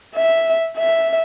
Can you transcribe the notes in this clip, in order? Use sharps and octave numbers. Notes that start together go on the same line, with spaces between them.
E5
E5